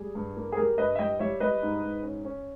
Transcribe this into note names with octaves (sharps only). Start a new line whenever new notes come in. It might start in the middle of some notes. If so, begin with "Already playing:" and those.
Already playing: G3 G#4
G2
A#3
G#4
G3 G4 A#4
G2 B4 D#5
E5
G3 D#5 G5
G3 C#5 E5
G3 B4 D#5
G#2
G#2
C#4
C#4